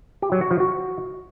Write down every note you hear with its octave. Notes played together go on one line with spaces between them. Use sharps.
G4
F#3
F#4
F3
F#4